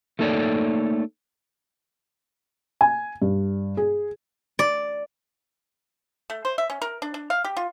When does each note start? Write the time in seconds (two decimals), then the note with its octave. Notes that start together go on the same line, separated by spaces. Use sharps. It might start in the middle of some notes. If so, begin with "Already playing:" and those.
0.19 A3 A#3 D#4 A4 C#5 D5
2.81 G#5
3.22 G2
3.77 G#4
4.59 D5
6.30 A3
6.45 C5
6.58 E5
6.70 C#4
6.82 A#4
7.02 D4
7.14 D4
7.30 F5
7.44 G4
7.57 F4